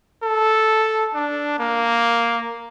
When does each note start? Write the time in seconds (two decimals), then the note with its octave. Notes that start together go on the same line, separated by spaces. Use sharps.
0.23 A4
1.14 D4
1.59 A#3